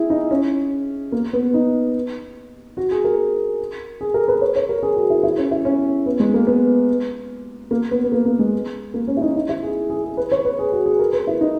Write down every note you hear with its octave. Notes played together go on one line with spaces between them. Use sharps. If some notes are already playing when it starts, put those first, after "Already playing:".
Already playing: E4 G#4
D#4
C#4
A#3
B3
D#4
F#4
G#4
A#4
G#4
A#4
B4
C#5
C#5
A#4
G#4
F#4
E4
E4
C#4
E4
C#4
B3
G#3
A#3
B3
A#3
B3
B3
A#3
A#3
G#3
A#3
C#4
E4
D#4
D#4
E4
G#4
G#4
G#4
B4
C#5
B4
G#4
F#4
G#4
A#4
B4
E4
D#4